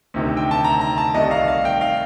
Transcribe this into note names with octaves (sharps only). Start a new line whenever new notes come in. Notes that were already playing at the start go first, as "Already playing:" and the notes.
D2 C3 D#3
G5
A5
A#5
A#5
A5
C2 C3 D#3 A3 D#5
F5
F5
G5
F5